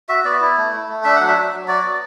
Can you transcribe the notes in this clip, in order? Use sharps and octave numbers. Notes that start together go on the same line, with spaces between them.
F#4 E5
B3 D5
E4
A3
A3
A3
D4 E5
F#3 F#5
E5
F#3
F#3
F#4 D5
B3